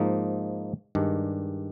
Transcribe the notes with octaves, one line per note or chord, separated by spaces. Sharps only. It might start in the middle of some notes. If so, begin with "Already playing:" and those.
Already playing: G#2 F3 A#3 D#4
G2 D#3 G#3 D4